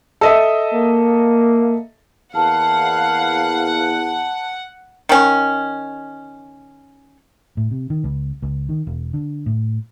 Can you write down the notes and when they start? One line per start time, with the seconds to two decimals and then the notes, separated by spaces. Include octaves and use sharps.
0.21 A4 D#5 E5
0.74 A#3
2.35 E2 A#3 E4 F5 F#5 A5 A#5
5.09 D#3 C#4
7.57 A2
7.71 C3
7.90 D#3
8.04 C#2
8.42 C#2
8.69 D#3
8.87 E1
9.13 D3
9.46 A2